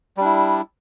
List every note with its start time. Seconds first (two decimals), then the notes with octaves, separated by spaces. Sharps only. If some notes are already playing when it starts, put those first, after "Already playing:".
0.17 G3
0.21 D4
0.25 E4